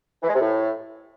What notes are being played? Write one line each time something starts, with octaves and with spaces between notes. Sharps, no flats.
E3
G#3
C3
A2